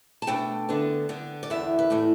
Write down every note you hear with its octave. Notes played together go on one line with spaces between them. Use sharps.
A5
B2 A3 D4 G5
D3 B3 D4
D3 B3 D4
D5
E2 D3 G3 B3 E5
B4
A2 E3 A3 D5